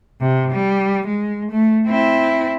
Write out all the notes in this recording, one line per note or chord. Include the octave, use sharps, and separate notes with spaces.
C3
G3
G#3
A3
C4 E4